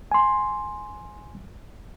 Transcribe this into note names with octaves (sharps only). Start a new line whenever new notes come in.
G#5 C6